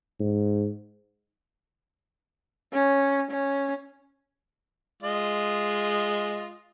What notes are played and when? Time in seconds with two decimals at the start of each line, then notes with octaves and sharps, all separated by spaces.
0.20 G#2
2.74 C#4
3.32 C#4
5.03 G#3 F4 D#5